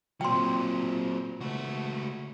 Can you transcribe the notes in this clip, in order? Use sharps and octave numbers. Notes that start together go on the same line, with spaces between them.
A#2 F#3 C4 G5 C6
C#2 A3 F#4